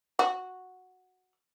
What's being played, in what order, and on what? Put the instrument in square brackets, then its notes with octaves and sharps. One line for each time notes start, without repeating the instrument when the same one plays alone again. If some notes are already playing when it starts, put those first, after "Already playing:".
[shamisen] F#4